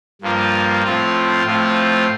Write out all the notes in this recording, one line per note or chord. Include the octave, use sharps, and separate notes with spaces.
G2 F3 A#3 F4
A2 F3 C4 F4
A2 F3 C4 F4